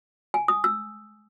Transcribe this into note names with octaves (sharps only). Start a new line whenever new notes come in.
G#5
D#6
E6